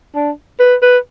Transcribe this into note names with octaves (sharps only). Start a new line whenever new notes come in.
D4
B4
B4